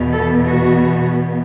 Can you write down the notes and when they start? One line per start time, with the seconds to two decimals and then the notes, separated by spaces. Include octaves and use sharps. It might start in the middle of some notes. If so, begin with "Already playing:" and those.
Already playing: E2 B2 B3
0.13 A4
0.48 F#4